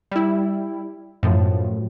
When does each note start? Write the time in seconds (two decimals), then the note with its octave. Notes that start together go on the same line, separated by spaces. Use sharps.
0.11 G3 E4
1.23 F#2 A2 F3